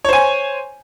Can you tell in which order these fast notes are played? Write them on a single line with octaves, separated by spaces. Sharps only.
C#5 C5 G#5